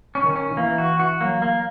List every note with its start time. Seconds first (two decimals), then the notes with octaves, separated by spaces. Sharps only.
0.15 C#4
0.25 D#3
0.36 C#4
0.57 E3 A#3
0.78 F#4
1.00 F#4
1.20 F#3 A#3
1.42 A#3